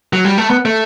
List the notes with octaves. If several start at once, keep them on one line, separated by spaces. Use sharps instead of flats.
F#3
G3
A3
B3
A3